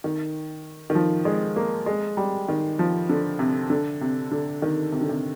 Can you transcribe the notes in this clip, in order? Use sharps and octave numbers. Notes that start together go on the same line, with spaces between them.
D#3
D#3
F3
G#3
A#3
G#3
G3
D#3
F3
D3
C3
D3
C3
D3
D#3
C3
D3
C3